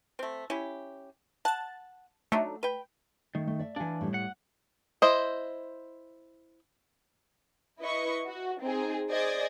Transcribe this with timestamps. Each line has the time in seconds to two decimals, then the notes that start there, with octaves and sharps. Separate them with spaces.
0.19 A3 C4
0.50 C#4 E4 G4
1.45 F#5 A5 A6
2.32 F#3 A3 D4 D#4
2.63 B4 G5
3.35 D#3 A3
3.47 A3
3.59 D5 E5
3.76 E3 D4 F5 G#5
4.01 A2 G3
4.14 F#5
5.02 E4 C5 D#5
7.81 E4 B4 D#5 C#6
8.27 F#4
8.61 C4 D#4 G#4
9.10 G#4 C5 D5 D#5 D#6 G#6